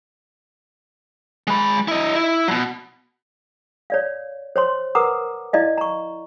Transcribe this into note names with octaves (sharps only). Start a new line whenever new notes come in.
G#3 B5
E4 D#5
E4
B2 F#3
C#5 D5 F5
C5 C#5 C6
A#4 B4 F#5 A#5 D6 D#6
E4 D5 D#5 F5
A#5 C#6